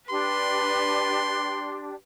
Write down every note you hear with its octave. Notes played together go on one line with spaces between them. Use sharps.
D4 G4 B4 C6